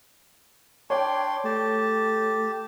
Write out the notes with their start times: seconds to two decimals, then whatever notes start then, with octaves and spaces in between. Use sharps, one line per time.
0.90 D4 C#5 G5 C6
1.45 A3 G4 A5